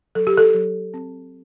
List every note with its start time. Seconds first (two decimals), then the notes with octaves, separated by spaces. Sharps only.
0.15 F#3 A4
0.27 G4
0.38 A4
0.54 F#3
0.94 C4